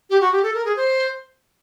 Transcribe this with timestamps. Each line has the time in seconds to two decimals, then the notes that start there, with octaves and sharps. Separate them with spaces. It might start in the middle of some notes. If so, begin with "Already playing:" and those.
0.10 G4
0.21 F#4
0.32 G4
0.43 A4
0.54 A#4
0.65 G#4
0.76 C5